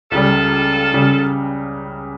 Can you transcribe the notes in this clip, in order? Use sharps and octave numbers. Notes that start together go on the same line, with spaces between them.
C#2 C#3 G3 F4 A4
C#3 G3